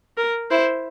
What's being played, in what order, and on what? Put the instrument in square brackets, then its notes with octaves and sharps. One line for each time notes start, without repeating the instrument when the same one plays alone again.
[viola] A#4
[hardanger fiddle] E4 [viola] C5